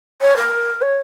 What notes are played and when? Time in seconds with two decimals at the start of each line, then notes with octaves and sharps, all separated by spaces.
0.21 C#5
0.36 A#4
0.82 C#5